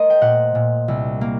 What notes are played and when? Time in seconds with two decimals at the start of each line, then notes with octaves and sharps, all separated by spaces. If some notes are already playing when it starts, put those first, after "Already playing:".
Already playing: A3 A#4 C5 D#5
0.10 G5
0.21 A#2 F#5
0.55 A#2
0.88 C2
1.21 A#3